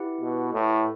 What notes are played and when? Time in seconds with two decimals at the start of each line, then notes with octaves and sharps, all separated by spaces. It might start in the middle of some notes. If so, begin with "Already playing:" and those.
Already playing: E4 G4 B4 F#5
0.21 B2
0.53 A2